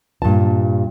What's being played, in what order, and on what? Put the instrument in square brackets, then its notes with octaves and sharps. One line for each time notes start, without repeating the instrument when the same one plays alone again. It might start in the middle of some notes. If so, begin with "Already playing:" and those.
[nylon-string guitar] G2 A#2 A5